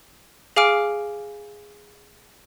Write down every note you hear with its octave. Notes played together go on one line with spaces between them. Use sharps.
G#4 F5 G#5 D6 F6 D7